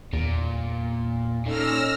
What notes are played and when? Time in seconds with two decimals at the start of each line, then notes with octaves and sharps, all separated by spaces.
0.13 E2 A#2
1.46 A#2 C#4 D#4 A4 E6 F6 A#6